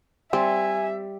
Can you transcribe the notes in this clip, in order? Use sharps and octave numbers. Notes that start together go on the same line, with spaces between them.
G3 C4 E5 G#5